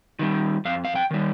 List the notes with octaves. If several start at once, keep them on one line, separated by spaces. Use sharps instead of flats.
D#3 G3
F2 F5
F5
G5
D#3 G3